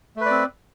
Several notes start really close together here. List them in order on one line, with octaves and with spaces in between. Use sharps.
A3 B4 D5 C4